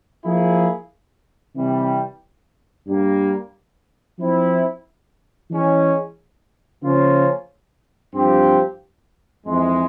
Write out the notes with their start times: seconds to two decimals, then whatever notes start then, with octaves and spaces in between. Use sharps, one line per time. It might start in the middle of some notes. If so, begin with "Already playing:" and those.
0.24 F3 A#3 E4 G#4
1.56 C3 E3 G3
2.87 G2 G3 A#3
4.19 F3 C4 E4
5.51 E3 G#3 C#4
6.83 C#3 F3 A#3 C#4 F4
8.14 G2 F3 C4 G4
9.46 F2 E3 G#3